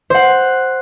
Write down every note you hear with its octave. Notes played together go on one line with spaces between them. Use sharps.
C5 F#5